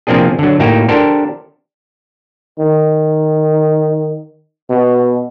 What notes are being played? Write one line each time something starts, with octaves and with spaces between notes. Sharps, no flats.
C3 F3 A#3 C4 D4 G#4
D3 F#3
A2 A#3 D#4 F#4 G4
D4 G4 A4 A#4 C5
D#3
B2